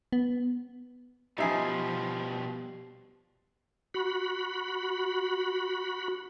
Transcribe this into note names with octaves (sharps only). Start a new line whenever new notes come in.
B3
B2 F3 G3 D#4 G4 E5 G#5 C7
F#4 B5